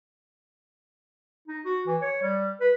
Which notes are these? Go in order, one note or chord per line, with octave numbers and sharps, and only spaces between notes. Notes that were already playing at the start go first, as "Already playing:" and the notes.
D#4
F#4
E3
C#5
G3
B4